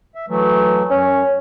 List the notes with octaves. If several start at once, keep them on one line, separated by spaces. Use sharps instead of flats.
E5
E3 F#3 A3
F#2 C#4